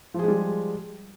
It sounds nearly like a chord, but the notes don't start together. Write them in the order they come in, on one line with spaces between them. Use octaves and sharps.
F3 G#4 G#3 G3